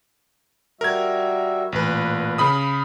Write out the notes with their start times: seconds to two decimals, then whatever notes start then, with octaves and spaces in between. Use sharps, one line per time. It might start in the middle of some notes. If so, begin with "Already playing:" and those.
0.81 G3 F#4 A#4 E5 G#6
1.72 A1 A#2 B4
2.38 C#3 B5 D#6